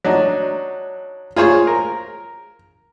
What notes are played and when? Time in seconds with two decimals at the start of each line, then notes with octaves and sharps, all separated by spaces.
0.05 F#3 D4 D#4
1.36 F4 G#4 C5 C#5
1.67 A#4